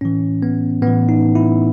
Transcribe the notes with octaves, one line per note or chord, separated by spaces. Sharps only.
A2 E3 C#4
B3
A2 E3 B3
D#4
E4